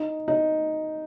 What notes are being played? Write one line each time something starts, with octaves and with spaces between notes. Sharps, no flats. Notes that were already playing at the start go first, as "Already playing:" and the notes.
Already playing: D#4
D#4